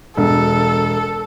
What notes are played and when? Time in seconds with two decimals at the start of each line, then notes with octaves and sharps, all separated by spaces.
0.17 E1 A4